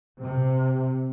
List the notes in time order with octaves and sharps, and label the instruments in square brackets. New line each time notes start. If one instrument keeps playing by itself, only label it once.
[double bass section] C3